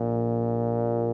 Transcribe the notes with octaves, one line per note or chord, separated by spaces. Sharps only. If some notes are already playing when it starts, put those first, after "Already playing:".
Already playing: A#1 A#2